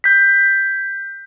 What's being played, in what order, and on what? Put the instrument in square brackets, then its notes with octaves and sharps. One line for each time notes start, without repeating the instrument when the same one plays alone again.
[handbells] G6 B6